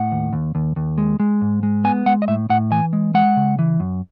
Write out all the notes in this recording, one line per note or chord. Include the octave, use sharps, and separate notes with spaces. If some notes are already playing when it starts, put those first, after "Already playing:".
Already playing: A2 F#5
D#2
D#2
D#2
D#2
G#3
G#3
G#2
G#3
B3 G#5
G#3 F#5
D#5
A2 E5
A2 F#5
E3 G#5
G#3
G#3 F#5
C#3
E3
F#2